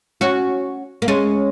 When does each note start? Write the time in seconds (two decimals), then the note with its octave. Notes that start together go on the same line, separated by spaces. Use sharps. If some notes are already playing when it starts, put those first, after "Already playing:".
0.21 C#4 F#4
1.02 A#3
1.08 G#3 C#4